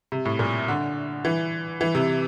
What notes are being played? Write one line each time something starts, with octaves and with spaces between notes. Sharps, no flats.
C3
A2
A#2
D3
E3
E3
C3